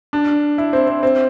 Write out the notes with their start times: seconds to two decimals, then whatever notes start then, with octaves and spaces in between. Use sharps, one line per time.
0.13 D4
0.58 E4
0.73 C4
0.87 C4
1.03 C4